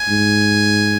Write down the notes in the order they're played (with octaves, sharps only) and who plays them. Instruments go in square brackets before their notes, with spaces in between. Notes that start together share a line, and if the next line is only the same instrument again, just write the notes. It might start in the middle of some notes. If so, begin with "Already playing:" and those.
Already playing: [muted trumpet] G#5
[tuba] G#2